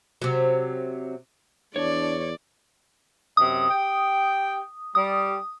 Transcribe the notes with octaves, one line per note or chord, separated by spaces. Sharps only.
C3 F#3
E2 D4 C#5 D5
F#2 C3 D#5 D#6
G4 G5
G3 D#6